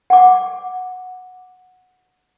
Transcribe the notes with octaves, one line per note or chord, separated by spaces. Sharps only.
F#5 D6